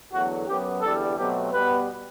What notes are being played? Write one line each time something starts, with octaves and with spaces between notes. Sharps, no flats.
E2 D3 F#3 A3 F#4
F#2 F#3 B3 G4
E2 D3 G3 A4
B2 F#3 A3 C4 G4
B2 G3 B3 B4